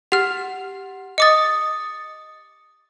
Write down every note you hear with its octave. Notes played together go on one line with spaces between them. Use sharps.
G4 F#5 F6 F7
D#5 D6 D#6 A6 C#7